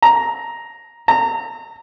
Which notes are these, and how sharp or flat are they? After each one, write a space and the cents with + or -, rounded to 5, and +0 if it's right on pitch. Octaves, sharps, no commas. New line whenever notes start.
A#5 +5
A#5 -25